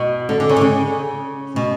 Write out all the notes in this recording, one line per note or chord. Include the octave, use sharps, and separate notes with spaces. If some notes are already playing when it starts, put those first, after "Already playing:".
Already playing: B2
D3
D3
C#3
D3
C#3
B2